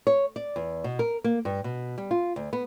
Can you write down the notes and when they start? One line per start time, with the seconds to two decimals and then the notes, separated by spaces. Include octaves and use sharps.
0.07 C#5
0.36 D5
0.56 E2
0.84 B2
0.99 A#4
1.24 A#3
1.45 G2
1.64 B2
1.98 G3
2.11 F4
2.36 D2
2.53 B3